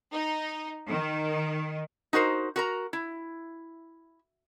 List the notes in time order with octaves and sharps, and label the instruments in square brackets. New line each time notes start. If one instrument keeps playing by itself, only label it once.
[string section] D#4
D#3
[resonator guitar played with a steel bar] D#4 F#4 A#4 C5
F#4 A#4 A#5
E4